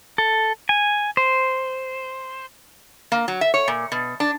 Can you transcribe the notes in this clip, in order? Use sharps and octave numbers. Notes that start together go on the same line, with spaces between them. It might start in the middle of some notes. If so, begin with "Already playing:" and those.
A4
G#5
C5
A#3
F#3
E5
C#5
A#2
B2
D4